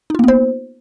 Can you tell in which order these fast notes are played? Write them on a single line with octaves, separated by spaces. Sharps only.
D#4 F4 A#3 B3 C5